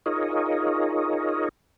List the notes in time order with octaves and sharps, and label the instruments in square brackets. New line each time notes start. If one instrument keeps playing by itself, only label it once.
[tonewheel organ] D#4 F4 G#4 A#4 C#5 D#5